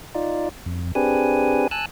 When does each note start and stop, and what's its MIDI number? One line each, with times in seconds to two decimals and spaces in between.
0.15 0.49 63
0.15 0.49 65
0.15 0.49 74
0.66 0.92 41
0.95 1.68 60
0.95 1.68 62
0.95 1.68 67
0.95 1.68 68
0.95 1.68 71
0.95 1.68 80
1.71 1.86 80
1.71 1.86 81
1.71 1.86 88
1.71 1.86 90